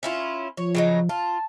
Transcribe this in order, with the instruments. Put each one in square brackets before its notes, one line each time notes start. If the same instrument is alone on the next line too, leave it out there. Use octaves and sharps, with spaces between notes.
[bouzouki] C#4 E4 F4
[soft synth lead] F3 [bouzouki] C#5
[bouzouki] C#3 F#3 D#4
[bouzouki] F4 [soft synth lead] A5